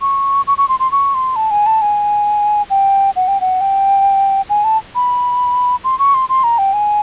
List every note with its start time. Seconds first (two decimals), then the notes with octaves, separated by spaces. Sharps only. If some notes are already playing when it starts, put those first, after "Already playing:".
0.01 C#6
0.47 C#6
0.58 C#6
0.69 C6
0.80 C6
0.92 C#6
1.14 C6
1.36 A5
1.51 G#5
1.66 A5
1.82 G#5
2.70 G5
3.16 F#5
3.28 G5
3.41 F#5
3.61 G5
4.49 G#5
4.64 A5
4.95 B5
5.84 C6
5.99 C#6
6.14 C6
6.29 C6
6.44 A#5
6.58 G5
6.73 G#5